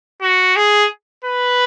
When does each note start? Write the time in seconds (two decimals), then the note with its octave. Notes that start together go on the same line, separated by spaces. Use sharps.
0.22 F#4
0.56 G#4
1.25 B4